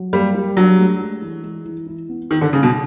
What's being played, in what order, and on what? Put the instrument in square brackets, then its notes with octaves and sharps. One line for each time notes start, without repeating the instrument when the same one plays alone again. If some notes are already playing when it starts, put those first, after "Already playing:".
Already playing: [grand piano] F#3
[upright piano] G3 [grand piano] A#3
[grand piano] G3
[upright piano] F#3 [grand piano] D4
[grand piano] A3
G#3
E3
G#3
E3
E4
B3
[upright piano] D#3 [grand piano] D#4
[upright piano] D3
[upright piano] C#3 [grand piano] A#3
[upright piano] B2